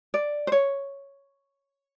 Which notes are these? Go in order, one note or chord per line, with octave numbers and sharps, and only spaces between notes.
D5
C5
C#5